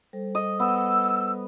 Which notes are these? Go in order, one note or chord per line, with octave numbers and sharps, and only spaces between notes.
G3 A4 C5
D#5
B3 E6